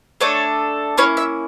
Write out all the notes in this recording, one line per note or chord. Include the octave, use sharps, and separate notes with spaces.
A3 D4 A4 C#5
A#3 C#4 E4 C#5
E5